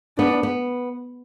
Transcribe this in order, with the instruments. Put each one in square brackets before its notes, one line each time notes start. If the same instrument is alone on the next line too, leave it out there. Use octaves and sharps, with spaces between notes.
[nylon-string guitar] B3 [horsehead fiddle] D4
[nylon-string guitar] B3